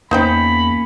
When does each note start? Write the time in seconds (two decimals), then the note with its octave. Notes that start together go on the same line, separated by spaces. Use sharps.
0.11 E2 A#3 C#4 D#4 C5 G5 B5